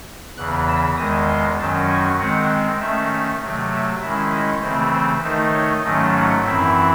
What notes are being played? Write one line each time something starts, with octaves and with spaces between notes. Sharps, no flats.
E2 C#3 E3 F#6
E6
E2 D#3 G#3 D#6
C6
F#2 D#3 F#3 C#4 A5
G#5
D#3 G#3 C4 F#5
D#3 A3 C#4 E5
C3 F#3 A3
E5
D#3 G#3 C#4 E4 E5
D#5
C#3 E3 A3 C4 C5
C5
D#3 A3 D#4 C5
C#5
G#2 D#3 F#3 A3 C#4 D#5
F#5
F#2 E3 C4 E4 E5